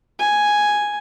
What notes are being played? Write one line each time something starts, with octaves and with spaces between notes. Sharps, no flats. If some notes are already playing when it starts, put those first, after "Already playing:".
G#5